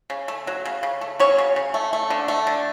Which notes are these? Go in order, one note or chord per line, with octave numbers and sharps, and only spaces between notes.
C#3
A3
F#3
C#3
C#3
A3
F#3 C#4 C#5
C#3
C#3
A3
A3
D3
A3
D3